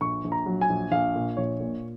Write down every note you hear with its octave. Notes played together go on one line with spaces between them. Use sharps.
A#1 C#6
A#1
A#5
F#3
G#5
A#1
A#1 F5
A#2
A#1 C#5
A#2